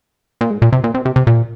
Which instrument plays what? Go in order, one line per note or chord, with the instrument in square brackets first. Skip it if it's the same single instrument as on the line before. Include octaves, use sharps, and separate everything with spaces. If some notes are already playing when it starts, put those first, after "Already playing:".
[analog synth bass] A#2
G#2
A#2
C3
A#2
C3
C3
C3
A#2